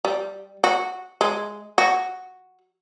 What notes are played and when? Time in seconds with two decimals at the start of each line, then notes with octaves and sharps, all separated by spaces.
0.05 G3
0.64 F#4
1.21 G#3
1.78 F#4